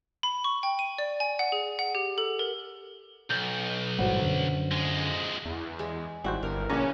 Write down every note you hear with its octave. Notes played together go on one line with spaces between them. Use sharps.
B5
C#6
G5
D#7
D5
G#5
F#5
G#4
F#5
G4
A4
A#4
B1 G6
A1 G#2 G3 F#4 C5 F#5
F#2 D3
F2 G#3
E2
G#3
G#1 G3 E4 F#4 C5
G1 A#4
A#1 C#3 C#4 B4 D5 A#5